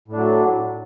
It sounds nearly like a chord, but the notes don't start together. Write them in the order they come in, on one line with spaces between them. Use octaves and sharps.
A2 D4 F#3